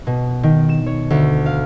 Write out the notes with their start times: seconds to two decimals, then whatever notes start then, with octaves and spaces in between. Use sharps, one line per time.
0.07 B2
0.43 D#3
0.69 E7
0.86 C#5
1.10 D2
1.46 F5